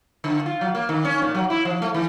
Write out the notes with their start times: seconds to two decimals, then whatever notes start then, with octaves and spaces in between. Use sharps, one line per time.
0.24 D3
0.46 F4
0.61 F#3
0.75 A#3
0.89 D#3
1.05 C#4
1.22 A#2
1.35 F#3
1.50 E4
1.65 F3
1.82 A3
1.94 E3